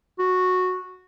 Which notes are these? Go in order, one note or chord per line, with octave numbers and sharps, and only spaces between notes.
F#4